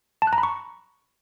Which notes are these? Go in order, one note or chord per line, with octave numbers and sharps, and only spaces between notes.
A5
F#6
A#5
B5
C#6